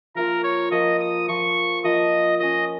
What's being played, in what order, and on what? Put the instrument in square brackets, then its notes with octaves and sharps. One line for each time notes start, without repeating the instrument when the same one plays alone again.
[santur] F3 A#3 F4 [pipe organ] A#4
[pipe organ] C#5
[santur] F3 A#3 F4 [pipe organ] D#5
[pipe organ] D#6
[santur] F3 A#3 F4 [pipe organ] C#6
[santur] F3 A#3 F4 [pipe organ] D#5
[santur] C#4 F4 C#5 [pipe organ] D#5